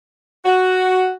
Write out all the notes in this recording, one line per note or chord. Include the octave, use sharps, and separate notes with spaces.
F#4